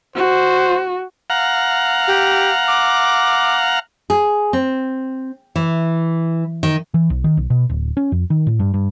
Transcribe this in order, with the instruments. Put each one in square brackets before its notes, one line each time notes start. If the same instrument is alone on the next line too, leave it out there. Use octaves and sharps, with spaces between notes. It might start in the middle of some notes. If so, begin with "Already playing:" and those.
[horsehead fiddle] F#4 [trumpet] C5
[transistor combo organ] F5 F#5 A#5
[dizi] G4
D6
[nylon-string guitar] G#4
C4
E3
D#3
[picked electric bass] E3
B1
D#3
B1
B2
D1
C#4
F2
D#3
A2
G2
G2